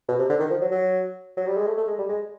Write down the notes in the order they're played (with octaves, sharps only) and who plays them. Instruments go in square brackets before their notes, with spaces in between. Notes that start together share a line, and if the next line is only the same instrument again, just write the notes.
[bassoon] B2
C3
D3
D#3
F3
F#3
F#3
F#3
G3
G#3
A3
A3
G#3
G3
G#3